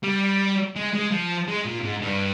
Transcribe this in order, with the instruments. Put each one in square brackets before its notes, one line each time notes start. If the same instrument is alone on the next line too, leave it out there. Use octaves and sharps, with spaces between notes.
[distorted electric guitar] G3
G#3
G#3
F3
G#3
A#2
G#2
G2